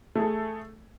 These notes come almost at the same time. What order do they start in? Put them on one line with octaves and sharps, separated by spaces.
A3 G#4 A4